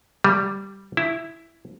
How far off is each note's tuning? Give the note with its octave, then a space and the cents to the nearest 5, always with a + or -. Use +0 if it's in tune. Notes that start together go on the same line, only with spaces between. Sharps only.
G3 -5
E4 +5